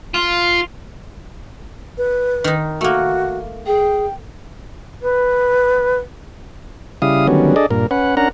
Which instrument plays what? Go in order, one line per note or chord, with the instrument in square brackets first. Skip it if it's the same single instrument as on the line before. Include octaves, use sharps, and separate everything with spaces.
[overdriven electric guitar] F4
[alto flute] B4
[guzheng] D#3 D#4
[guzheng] A3 A#3 [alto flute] F#4
[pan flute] G#4 [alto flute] G5
[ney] B4
[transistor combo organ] C#3 G3 E4 F5 D#6
D3 D#3 F#3 G3 B3 C#4
D4 G#4 A4 D5 D#5
G2 A#2 A#4
C#4 B4 F#5
C#4 D4 A#4 F#5 A#5